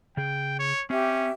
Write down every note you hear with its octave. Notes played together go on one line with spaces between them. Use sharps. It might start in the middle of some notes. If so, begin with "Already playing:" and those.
C#3 G#4 G5
C#5
C4 C#4 G4 E5